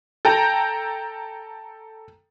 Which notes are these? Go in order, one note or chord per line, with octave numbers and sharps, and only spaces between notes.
A4 G5 A#5